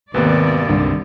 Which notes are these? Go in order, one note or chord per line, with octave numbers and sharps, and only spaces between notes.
G#1 D#2 C3 A#3 B3 B4 D5
C2 G2 D3 G3